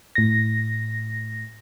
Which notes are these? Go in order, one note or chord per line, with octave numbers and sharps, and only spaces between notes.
A2 A#6